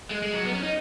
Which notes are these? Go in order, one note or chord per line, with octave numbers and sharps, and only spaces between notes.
G#3
G#3
F#3
B3
C#4
D#4